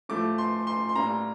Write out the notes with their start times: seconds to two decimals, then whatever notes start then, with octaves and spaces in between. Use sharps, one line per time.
0.09 A2 F3 A3 D6
0.38 C6
0.67 C6
0.89 C6
0.95 A2 G3 A#3 A#5